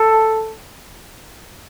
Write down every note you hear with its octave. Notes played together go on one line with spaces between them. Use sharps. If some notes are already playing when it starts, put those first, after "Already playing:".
Already playing: A4